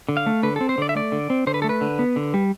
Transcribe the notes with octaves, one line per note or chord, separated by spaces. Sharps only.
D3
F5
A3
D3 B4
C4 A4
C5
D3 D5
E5
A3 D5
D3
C4
D3 C5
B4
A3 A4
B4
D3
B3
D3
G3